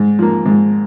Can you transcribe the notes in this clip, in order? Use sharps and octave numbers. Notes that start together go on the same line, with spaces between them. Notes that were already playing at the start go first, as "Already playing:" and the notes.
Already playing: G#2
F3 A#3
G#2